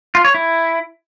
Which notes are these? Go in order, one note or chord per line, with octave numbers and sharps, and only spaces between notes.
F4
C#5
E4